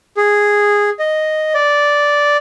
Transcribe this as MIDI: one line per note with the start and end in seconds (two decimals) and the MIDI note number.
0.17 0.90 68
0.99 1.53 75
1.54 2.37 74